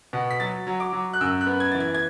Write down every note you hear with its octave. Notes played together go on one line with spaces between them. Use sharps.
B2
B6
F#3 A6
F#3
D6
F#3
F#6
F#2 E6
F#6
B3
G#6
E3 A6
G#6
G#6